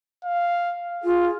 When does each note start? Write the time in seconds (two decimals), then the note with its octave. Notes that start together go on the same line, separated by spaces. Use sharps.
0.24 F5
1.04 F4 G#4